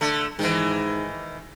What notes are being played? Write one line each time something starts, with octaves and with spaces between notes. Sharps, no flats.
D3 A3
G#2 D#3 E3